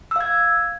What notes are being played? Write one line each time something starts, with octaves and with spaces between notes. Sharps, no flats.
F5 E6 G#6